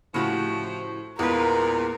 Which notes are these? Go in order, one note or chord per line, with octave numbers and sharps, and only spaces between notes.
A2 C#3 F3 F#4 G4
E2 A#2 G#3 A#3 A#4 B4